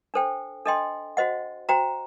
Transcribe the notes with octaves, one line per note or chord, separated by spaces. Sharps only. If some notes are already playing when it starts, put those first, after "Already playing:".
D4 A4 C5 G5
D4 A4 D#5 G5 C6
F#4 C5 D#5 F#5
F#4 C5 G5 A#5